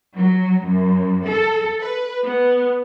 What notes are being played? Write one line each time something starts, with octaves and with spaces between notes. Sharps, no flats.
F#3
F#2
A4
B4
B3